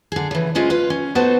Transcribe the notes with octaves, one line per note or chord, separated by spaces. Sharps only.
D3 G#4
C#3 E3
G#3 C#4 F4 G#4 C5
F4 B4
C#4
B3 D#4 F#4 A4 B4 C5